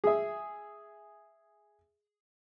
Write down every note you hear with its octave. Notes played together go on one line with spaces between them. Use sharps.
G#4 E5